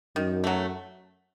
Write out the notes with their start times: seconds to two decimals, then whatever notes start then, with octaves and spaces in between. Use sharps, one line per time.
0.16 F#2 D#3
0.44 F#3 A3